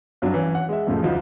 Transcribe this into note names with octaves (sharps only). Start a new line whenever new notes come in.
G2 F#3 C4 D4
E3 C#4
F#5
G#3 E5
F2 A2 C#3 F3 G#3 A3
D2 F3 D#4